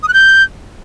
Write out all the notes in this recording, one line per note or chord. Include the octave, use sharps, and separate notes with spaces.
D#6
F#6
G6